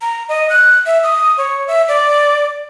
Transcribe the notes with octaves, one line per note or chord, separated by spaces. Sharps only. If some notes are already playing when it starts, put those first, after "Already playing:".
A#5
D#5
F#6
E5
D#6
C#5
E5
D5